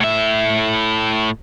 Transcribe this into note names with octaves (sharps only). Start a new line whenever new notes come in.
A2 E5